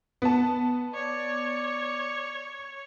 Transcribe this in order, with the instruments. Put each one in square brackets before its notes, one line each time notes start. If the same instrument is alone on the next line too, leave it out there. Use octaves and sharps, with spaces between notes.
[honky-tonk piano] B3 A5
[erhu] C#5 [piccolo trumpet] D5